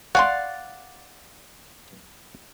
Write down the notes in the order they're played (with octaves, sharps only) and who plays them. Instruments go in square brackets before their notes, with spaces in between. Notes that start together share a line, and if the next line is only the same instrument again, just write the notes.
[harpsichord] C#5 G#5 C6 [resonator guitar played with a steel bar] D5 F5 [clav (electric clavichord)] F#5